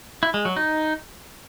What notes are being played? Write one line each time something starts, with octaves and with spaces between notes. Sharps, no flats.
E4
G#3
F#3
D#4